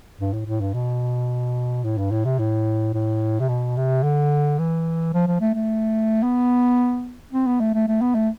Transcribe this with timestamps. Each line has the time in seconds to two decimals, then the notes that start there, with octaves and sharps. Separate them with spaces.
0.20 G2
0.33 A2
0.46 A2
0.61 G2
0.74 B2
1.84 A2
1.98 G2
2.11 A2
2.25 C3
2.39 A2
2.94 A2
3.40 C3
3.49 B2
3.77 C3
4.03 D3
4.59 E3
5.13 F3
5.27 F3
5.41 A3
5.54 A3
6.23 B3
7.33 C4
7.47 B3
7.60 A3
7.74 A3
7.88 A3
8.01 B3
8.15 A3